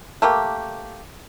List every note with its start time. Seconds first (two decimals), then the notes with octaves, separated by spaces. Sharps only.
0.22 A3 A#3 G4